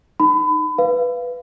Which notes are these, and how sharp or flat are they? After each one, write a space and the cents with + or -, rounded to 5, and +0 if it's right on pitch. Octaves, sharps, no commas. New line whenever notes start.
D#4 -10 B5 +30
B4 +0 F5 -15